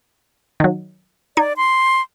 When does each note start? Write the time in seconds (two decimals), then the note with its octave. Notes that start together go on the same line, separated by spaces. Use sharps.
0.60 D#3 F#3
1.37 D#4 D5 G#6
1.57 C6